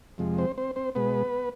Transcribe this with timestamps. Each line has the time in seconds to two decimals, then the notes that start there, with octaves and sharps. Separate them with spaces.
0.18 F2 C3 F3 G#3
0.38 C4 C5
0.58 C4 C5
0.76 C4 C5
0.95 B2 G#3 B3 B4